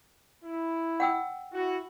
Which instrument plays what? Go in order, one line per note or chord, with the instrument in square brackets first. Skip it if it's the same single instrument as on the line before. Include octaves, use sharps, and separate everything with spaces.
[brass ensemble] E4
[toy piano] F#5 G5 E6
[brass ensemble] E4 F#4